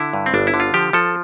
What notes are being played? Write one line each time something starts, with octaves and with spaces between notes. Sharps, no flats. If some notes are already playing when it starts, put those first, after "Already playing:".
Already playing: D3 E4
G2
C4
G1 D4
E4
D3
F4
F3 G4
F3 A4